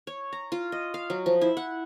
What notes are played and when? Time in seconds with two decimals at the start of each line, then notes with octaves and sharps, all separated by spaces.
0.07 C#5
0.33 A#5
0.52 F4
0.72 D#5
0.94 F5
1.10 F#3
1.26 F3
1.41 E4
1.57 F#5